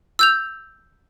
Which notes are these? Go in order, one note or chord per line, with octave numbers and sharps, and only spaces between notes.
E6 G6 F7